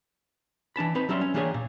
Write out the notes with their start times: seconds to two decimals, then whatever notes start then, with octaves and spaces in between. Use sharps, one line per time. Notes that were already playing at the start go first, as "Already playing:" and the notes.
0.76 E3 D4 A5 B5
0.95 C4 D#4 B4
1.09 F#3 G3 C#4 E5 C6
1.21 C#4
1.34 E3 A#3 D4 G4 G#4 C#5
1.54 A#2